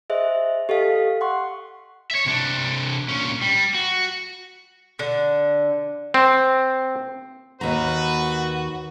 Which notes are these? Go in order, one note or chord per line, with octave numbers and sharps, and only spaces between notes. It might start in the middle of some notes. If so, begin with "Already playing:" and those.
G#4 C5 D#5 E5
G4 A4 D#5 F5
F#5 C6 C#6
C#5 E5
C3 D4
A#2 C#4
G3
F#4
D3
C4
D#2 F#4 B4 A#5